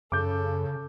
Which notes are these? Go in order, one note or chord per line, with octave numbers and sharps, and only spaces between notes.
F#2 C#3 A4 D6 G6